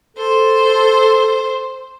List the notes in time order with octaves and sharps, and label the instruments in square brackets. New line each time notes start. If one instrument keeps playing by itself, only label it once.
[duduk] A4 [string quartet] C5